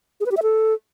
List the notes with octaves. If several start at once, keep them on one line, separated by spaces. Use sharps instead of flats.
G#4
B4
G4
E5
A4